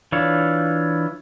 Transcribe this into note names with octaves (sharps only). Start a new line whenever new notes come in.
E3 D4 F4 C#5